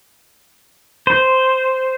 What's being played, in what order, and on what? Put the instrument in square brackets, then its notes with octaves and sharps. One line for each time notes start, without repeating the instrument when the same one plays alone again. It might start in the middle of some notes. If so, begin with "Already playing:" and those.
[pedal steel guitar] C5